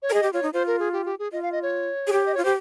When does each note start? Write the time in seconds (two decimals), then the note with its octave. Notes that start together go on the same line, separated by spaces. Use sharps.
0.02 C#5
0.09 A#4
0.14 G#4 D#5
0.23 G4
0.33 F4 C#5
0.43 D#4
0.53 F4 C5
0.67 A#4
0.79 G#4
0.93 G4
1.06 G4
1.19 G#4
1.32 F4 D#5
1.42 F5
1.52 D#5
1.63 C#5
2.07 G#4
2.12 G4
2.26 D#5
2.34 F4 C#5
2.43 G4 C5